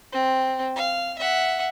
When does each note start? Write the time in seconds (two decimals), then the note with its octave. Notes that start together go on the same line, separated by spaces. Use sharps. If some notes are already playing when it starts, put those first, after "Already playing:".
0.13 C4
0.76 F5
1.18 E5 F#5